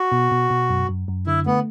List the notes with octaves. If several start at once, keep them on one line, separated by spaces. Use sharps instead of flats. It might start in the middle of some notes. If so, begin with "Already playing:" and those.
Already playing: F#4
B2
B2
B2
F#2
F#2
F#2
D3 E4
A3 B3